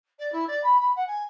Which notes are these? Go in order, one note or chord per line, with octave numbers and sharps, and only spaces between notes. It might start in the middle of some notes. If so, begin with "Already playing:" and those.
D5
E4
D5
B5
B5
F#5
G#5